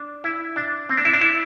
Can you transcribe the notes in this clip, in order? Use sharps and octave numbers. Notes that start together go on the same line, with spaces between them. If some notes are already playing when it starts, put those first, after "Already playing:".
Already playing: D4
E4
D4
C4
D4
E4
D4
E4